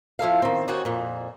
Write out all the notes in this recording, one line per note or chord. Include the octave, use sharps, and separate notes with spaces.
F3 E4 A4 F5
D#3 C4
D#2 D#3 C4 F#4 C#5 G#5
F2 A#2